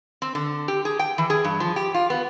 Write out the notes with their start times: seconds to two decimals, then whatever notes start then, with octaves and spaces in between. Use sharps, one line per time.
0.22 C4
0.35 D3
0.68 G4
0.85 G#4
0.99 G5
1.18 E3
1.30 G#4
1.44 G2
1.60 F3
1.76 G4
1.94 F4
2.10 B3